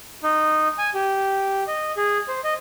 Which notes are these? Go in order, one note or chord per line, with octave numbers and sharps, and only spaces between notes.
D#4
G#5
G4
D#5
G#4
C5
D#5